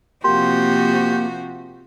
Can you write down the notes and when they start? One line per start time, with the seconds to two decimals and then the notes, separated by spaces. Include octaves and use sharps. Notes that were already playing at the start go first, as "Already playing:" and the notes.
0.24 C3 F3 A#3 F#4 G4 C6